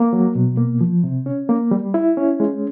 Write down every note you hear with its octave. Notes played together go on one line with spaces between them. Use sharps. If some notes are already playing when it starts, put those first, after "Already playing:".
Already playing: A#3
F#3
B2
A#3
F3
C3
C#4
A#3
G3
E4
C#4
G#3